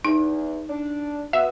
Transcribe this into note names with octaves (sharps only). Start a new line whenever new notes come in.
E2 D#4
D4
B3 F#4 E5